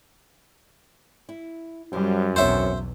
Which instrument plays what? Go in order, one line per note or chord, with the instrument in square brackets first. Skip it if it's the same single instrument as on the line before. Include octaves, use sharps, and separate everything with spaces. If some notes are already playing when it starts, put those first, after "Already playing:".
[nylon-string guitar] E4
[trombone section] F#2 [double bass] G3 [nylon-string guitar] C5
[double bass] B1 E2 [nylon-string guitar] B3 C4 C#5 [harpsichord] C5 E5